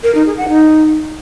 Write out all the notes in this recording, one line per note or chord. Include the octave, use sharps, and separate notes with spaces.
A#4
D#4
G#4
F#5
D#4